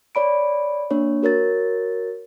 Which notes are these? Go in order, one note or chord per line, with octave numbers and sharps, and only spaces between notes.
C#5 D5 B5 D7
A#3 D4 C#5
F#4 A#4 C#5 A6